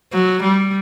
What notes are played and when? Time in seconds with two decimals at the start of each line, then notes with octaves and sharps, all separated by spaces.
0.13 F#3
0.43 G3